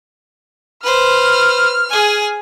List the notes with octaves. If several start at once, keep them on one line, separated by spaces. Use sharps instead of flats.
B4 C5 F6
G#4 G#5